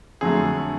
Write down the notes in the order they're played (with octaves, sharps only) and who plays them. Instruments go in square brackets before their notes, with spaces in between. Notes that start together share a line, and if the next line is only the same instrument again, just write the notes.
[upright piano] F2 D3 F#3 A3 G#4